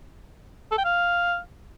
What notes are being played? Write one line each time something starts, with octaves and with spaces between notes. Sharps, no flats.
A4
G5
F5